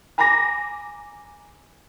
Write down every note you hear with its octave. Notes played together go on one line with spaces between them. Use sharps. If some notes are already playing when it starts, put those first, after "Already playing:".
G#5 A#5 B5 D6 A#6